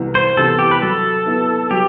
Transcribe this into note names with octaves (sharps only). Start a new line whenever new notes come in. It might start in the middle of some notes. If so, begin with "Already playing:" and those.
Already playing: C2 C3 E3 B3
C5
C3 E3 B3 A4
G4
B4
F#3 A4
B3 E4
F#3 G4